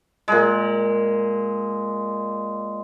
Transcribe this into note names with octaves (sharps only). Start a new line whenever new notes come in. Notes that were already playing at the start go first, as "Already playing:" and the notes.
A#2 G#3